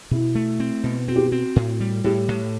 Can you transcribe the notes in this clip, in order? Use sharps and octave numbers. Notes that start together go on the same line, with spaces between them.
B2 E4
A3
C4
B2
C4 F#4
G4
F#4
C4
A2
G3
A2 G4
A2